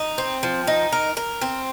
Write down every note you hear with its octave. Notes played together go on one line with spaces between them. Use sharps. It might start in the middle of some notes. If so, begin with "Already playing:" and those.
Already playing: D#4
C4
F3
D#4
A#4
A#4
C4